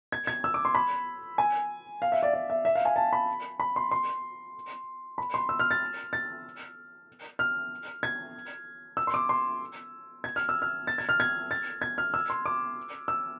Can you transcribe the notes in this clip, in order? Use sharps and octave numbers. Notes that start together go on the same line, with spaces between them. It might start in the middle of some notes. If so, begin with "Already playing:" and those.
G#6
G#6
E6
D6
C6
B5
G#5
F5
E5
D5
D5
E5
E5
F5
G#5
A5
B5
B5
C6
C6
B5
C6
E6
F6
A6
A6
F6
G#6
E6
C6
D6
C6
G#6
F6
E6
F6
A6
G#6
F6
G#6
A6
G#6
F6
E6
C6
D6
E6